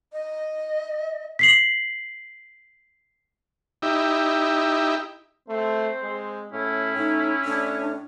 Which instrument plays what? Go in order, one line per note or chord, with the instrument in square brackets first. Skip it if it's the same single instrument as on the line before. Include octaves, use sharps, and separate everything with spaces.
[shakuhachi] D#5
[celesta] B6 C7 F#7
[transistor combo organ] D#4 E4 G4
[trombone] A3 [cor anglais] C4 [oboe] C5
[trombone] G#3
[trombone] A2 [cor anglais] C#4 [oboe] E4
[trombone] A2 [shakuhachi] D#4
[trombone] A2 [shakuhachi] D4